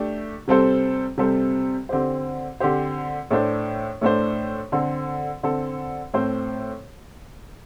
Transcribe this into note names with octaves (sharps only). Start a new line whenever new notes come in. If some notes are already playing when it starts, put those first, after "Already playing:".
Already playing: A3 D4 G4
C3 G3 C4 A4 C5
C3 G3 C4 A4 C5
D3 C4 G4 C5
D3 C4 G4 C5
A2 A3 D4 C5
A2 A3 D4 C5
D3 C4 A4
D3 C4 A4
A2 A3 C4 A4 C5